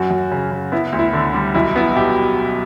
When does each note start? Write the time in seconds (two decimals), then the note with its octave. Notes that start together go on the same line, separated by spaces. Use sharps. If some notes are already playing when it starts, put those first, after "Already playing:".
Already playing: F#2 F#4
0.11 F#2
0.32 C#3
0.51 C#3
0.72 B3 E4
0.92 D2
0.99 E4
1.13 D3
1.34 G3
1.54 B1 E4
1.76 B3 E4
1.96 B2 G4